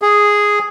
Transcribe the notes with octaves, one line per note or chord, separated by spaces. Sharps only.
G#4